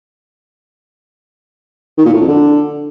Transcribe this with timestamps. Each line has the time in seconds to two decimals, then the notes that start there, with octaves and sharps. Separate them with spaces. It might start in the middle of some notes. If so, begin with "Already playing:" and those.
1.98 D#3
2.06 A#2
2.13 A2
2.21 F2
2.28 D3